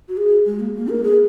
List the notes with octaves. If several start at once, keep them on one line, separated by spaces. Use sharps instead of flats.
F#4
G#4
G#3
A#3
A#3
A#4
G#4